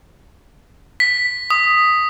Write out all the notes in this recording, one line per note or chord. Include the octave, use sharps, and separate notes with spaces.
B6
D#6